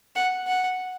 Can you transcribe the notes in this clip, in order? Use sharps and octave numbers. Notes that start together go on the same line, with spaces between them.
F#5
F#5